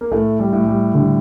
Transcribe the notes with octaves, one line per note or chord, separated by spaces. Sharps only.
A#3
A2 A3
G3
A2
G3
D3 G3